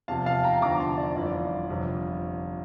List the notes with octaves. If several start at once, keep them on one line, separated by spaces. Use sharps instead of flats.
E2 C3 F3 F5 A5
F5 A5
G5 A#5
E2 D3 F3 A#5 D6
A5 C6
D5
G1 F2 E3 D5
G1 F2 C3